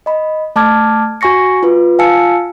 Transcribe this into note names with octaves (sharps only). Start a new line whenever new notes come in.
D#5 B5
A3 A5 D6 F6 G#6
F#4 G#5 C#6 A#6 C#7
F4 B4
F4 F5 G#5 A5 E6 C#7